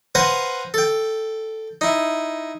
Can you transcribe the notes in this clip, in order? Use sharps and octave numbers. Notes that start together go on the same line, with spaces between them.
B4 C5 F5 F#5 G#5 A#5
A4 G5
D#4 E4